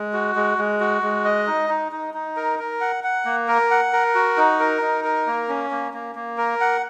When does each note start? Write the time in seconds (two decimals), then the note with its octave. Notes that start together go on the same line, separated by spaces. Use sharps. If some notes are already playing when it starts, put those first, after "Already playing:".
Already playing: G#3
0.13 F#4
0.36 G#3
0.58 G#3
0.80 F#4
1.02 G#3
1.25 D#5
1.47 D#4
1.70 D#4
1.92 D#4
2.14 D#4
2.37 A#4
2.59 A#4
2.81 F#5
3.04 F#5
3.25 A#3
3.48 A#4
3.71 F#5
3.93 A#4
4.15 F#4
4.37 D#4
4.60 A#4
4.82 D#4
5.04 A#4
5.27 A#3
5.49 C#4
5.71 A#3
5.94 A#3
6.15 A#3
6.38 A#4
6.61 F#5